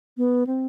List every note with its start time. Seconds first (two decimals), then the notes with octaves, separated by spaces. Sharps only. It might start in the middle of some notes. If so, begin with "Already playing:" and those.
0.17 B3
0.47 C4